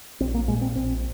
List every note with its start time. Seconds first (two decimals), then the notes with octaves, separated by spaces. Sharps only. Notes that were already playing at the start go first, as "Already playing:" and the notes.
0.20 A#1 C4
0.34 A#3
0.48 A#2 G#3
0.61 C4
0.76 A#1 C4